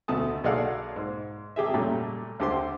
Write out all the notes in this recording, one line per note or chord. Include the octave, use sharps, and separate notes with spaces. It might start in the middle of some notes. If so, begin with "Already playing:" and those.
D2 B2 A3 A5 D#6
B1 G#4 A4 D5 F5 F#5
G#2
G#1 G4 G#4 E5
A#2 C#3 F#3 G3 A3
D2 D3 G4 C5 C6